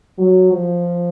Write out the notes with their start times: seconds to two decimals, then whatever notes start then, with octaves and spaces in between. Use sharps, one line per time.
0.18 F#3
0.52 F3